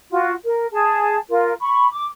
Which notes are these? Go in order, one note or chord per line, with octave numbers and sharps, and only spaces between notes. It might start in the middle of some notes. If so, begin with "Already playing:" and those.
F4 F#4
A#4
G#4 A5
F4 A#4
B5 C#6
D6